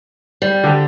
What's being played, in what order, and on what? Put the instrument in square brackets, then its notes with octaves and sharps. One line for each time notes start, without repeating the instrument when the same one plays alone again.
[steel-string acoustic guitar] G3
[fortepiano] D3 G4